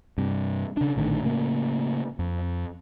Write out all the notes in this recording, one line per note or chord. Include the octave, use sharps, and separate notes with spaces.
G2 C3
C#3 D4
A#1 A2 D3 D#3
A2 C#3 A#3
F2